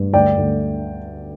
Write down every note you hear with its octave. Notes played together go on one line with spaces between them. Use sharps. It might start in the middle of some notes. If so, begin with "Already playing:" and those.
Already playing: G2
D2 D5 G5
D2